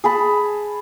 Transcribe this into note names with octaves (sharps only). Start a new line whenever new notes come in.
G#4 A5 B5